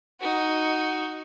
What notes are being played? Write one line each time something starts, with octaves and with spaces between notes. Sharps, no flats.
D#4 F#4